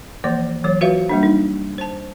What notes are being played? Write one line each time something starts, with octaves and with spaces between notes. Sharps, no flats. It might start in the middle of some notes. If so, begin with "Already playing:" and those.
E3 F3 A#3 D5
E3 F#3 C#5
F4 F#4 B4 C5 E5 F5
G3 A#3 D4
D#4
C5 A5